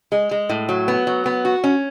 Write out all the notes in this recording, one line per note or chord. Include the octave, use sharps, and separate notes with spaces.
G#3
G#3
A2
F#3
B3
F#3
B3
F#4
C#4